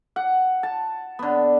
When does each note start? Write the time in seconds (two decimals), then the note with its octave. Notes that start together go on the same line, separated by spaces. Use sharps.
0.16 F#5
0.63 A5
1.19 D3 B3